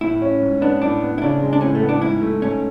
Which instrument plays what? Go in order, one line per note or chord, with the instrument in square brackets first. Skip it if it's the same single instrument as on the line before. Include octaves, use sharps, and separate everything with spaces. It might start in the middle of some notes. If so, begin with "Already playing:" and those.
[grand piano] A2 [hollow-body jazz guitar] E4
[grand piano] C#4
G#2
[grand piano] B3 [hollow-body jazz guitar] D4
[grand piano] A2 [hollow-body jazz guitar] D4
[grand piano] B3
[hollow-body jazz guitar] E4
[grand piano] C#3 [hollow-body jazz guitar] D4
[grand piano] G#3
[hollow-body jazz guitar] D4
[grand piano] A2 [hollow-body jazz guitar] C#4
[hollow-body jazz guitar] A3
[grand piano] B3
[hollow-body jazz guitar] D4
[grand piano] G#2 [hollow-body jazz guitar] E4
[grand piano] A3
[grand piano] G#2 [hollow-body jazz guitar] C#4